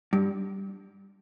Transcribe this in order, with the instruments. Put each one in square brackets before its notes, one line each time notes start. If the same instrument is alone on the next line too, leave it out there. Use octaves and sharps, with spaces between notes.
[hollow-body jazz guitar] G2